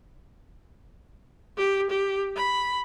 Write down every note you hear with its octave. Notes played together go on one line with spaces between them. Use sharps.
G4
G4
B5